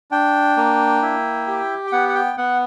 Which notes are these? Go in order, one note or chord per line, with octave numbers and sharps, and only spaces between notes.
D4 G5
A#3
E4
G4
G5
B3 F#5
F#5
G5
B3 F#5